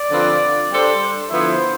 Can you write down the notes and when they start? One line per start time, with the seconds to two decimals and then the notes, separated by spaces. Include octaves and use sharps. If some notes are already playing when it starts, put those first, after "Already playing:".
Already playing: D5
0.10 D3 F3 C4 F4 B4
0.71 G3 D4 A4 C5
1.30 D3 F3 B3 E4 C5